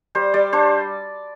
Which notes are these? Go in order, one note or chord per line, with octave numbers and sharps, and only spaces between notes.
G3 C5
G3 D5
D4 C5